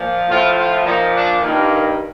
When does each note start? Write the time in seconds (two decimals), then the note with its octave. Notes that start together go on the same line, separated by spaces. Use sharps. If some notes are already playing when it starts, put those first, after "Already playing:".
Already playing: A#2 F3
0.29 A2 F3 F4
0.57 F4
0.85 A#2 F3 D#4
1.14 D4
1.42 G2 D#3 A#3